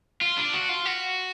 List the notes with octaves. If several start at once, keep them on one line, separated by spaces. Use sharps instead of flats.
F4
D4
F#4
F4
F#4